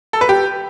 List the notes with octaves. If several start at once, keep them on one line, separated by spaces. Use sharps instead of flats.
A4
B4
G4